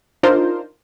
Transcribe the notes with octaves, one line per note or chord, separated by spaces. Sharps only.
D4 D#4 F4 A#4 C5